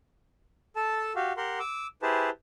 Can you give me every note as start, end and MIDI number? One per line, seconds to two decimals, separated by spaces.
0.76 1.13 69
0.76 1.13 81
1.16 1.33 66
1.16 1.33 67
1.16 1.33 77
1.37 1.59 67
1.37 1.59 70
1.37 1.59 78
1.37 1.59 84
1.60 1.87 86
1.60 1.87 88
2.02 2.30 64
2.02 2.30 67
2.02 2.30 68
2.02 2.30 71
2.02 2.30 72
2.02 2.30 81